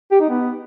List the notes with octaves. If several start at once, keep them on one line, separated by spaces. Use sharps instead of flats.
G4
D#4
B3